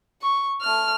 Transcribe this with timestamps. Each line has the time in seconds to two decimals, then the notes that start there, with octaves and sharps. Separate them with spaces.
0.22 C#6
0.61 A3 F6